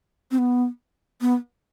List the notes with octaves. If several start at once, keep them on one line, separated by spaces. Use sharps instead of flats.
C4
B3
B3